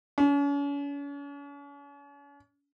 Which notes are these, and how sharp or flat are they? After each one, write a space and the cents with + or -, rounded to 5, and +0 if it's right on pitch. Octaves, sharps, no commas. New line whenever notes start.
C#4 +40